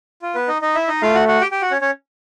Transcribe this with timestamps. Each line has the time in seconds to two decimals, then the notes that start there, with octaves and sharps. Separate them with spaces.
0.22 F4
0.35 B3 B4
0.48 D#4 D#5
0.62 D#4 D#5
0.75 E4 E5
0.88 D#4 D#5
1.02 A3 F4 F5
1.15 F#4 F#5
1.28 F#4 F#5
1.41 G4 G5
1.51 G4 G5
1.62 F#4 F#5
1.71 C#4 C#5
1.81 C#4 C#5